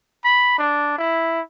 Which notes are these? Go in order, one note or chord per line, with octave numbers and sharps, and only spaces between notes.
B5
D4
E4